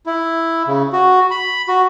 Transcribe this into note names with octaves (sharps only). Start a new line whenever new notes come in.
E4
C#3
F#4
B5
F#4